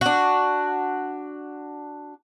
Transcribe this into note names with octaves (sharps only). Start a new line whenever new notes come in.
D4 F#4